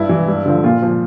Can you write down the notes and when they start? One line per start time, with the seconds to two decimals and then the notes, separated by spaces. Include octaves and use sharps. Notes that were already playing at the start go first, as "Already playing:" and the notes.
Already playing: G2 E4
0.09 E3
0.28 G2
0.46 D3 F3
0.64 A#2 F4
0.82 F3